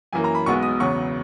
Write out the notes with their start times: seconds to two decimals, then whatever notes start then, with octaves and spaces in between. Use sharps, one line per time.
0.13 F#2 E3 A#3 G#5
0.24 A#5
0.35 B5
0.46 B1 B2 G#3 B3 C#6
0.63 D#6
0.80 E2 C#3 F#3 B3 C#6